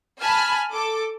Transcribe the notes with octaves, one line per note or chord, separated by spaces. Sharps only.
G#5 A5 B5 F6
A4 D6